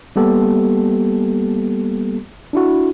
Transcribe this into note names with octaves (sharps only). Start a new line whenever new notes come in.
G3 A#3 B3 G4 A4
D4 E4 F#4